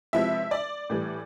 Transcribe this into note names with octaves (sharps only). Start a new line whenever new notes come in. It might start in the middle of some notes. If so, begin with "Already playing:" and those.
C3 F3 G#3 B3 E4 E5
D5
A2 E3 G3